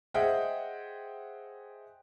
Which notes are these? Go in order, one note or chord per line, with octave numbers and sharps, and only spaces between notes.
G#4 C5 D#5 E5 F#5 G5